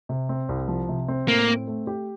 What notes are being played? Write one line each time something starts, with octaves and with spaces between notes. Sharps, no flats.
C3
C4
C2
F3
C3
C4
A2 A#3
C4
A3
G4